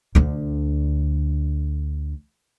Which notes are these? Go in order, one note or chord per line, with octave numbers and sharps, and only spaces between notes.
D2 D3